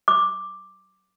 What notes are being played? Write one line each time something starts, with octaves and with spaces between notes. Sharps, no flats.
D6